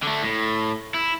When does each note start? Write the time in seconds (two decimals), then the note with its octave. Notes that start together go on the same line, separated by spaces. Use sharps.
0.03 D3 A3
0.23 A2
0.94 E4